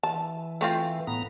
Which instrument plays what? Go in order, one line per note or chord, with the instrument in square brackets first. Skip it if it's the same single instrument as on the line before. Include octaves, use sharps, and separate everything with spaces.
[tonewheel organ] E3 [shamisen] A5
[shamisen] A3 C4 F4
[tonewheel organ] A2 B3 A#5